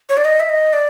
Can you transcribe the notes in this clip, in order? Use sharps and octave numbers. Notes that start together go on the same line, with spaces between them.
C#5
D5
D#5
E5
D#5
D5